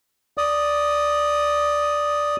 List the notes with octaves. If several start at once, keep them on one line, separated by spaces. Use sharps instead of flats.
D5 D#6